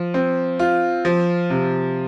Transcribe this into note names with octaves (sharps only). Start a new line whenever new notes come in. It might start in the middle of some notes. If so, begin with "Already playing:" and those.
Already playing: F3
C4
F4
F3
C3